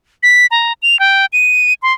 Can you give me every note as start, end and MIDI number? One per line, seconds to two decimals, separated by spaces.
0.23 0.46 95
0.51 0.73 82
0.82 0.99 101
1.00 1.26 79
1.33 1.73 99
1.82 1.93 84